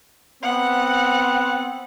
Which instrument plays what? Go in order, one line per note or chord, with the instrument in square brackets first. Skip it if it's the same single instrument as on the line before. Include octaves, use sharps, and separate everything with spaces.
[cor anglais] B3 [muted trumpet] C4 [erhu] F#5